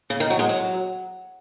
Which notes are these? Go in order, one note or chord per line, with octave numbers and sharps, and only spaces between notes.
C#3
D#3
F#3
G#3
F#3